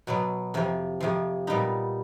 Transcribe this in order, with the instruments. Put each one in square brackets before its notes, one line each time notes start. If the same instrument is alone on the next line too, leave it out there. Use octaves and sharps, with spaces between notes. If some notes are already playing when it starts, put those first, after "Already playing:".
[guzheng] B2 F#3 B3
F2 C3 F3
F2 C3 F3
A#2 G3 B3 D#4